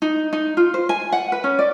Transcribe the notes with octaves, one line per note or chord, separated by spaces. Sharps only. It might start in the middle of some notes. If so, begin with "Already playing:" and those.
D#4
D#4
F4
C5
G#5
F#5
B4
C#4
D5